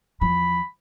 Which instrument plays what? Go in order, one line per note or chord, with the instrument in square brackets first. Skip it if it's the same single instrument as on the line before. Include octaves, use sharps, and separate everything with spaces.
[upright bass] E2 F3 [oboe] B5